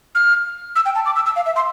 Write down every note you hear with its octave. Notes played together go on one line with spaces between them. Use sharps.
F6
E6
G5
A5
D6
E6
E6
F5
E5
C6